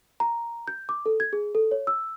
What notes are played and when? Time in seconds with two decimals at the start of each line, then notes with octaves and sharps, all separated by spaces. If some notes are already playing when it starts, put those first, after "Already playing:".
0.20 A#5
0.67 G6
0.89 D6
1.06 A4
1.20 G#6
1.33 G#4
1.55 A4
1.71 C#5
1.87 E6